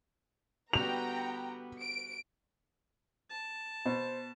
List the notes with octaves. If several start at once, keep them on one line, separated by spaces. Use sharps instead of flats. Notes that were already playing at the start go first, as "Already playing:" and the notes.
D3 G3 B3 F#4 G5 A#5 F7
D7
A5
B2 C5